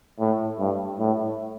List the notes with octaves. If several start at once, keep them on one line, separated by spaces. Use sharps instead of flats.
A2
G2
A2